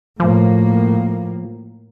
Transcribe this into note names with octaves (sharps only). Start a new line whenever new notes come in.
A2 F3 A#3